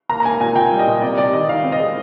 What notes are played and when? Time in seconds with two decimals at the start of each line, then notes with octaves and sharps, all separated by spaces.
0.09 A#3 A#5
0.20 A#5
0.25 A#3 G#5
0.40 A#2 G#5
0.56 A#2 G5
0.71 G3
0.79 D#5
0.87 A#2
1.02 C3 D5
1.18 C3 D5
1.33 D#3 D#5
1.49 D#3 F5
1.64 C4
1.72 D#5
1.80 G#3